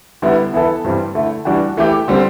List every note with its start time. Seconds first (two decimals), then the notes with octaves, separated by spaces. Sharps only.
0.22 D3 G3 B3 E4
0.53 E3 B3 E4 A4
0.84 G2 E3 G3 C4
1.15 D3 A3 E4
1.45 E3 G3 D4 F#4
1.77 E3 A3 E4 G4
2.08 D3 G3 C4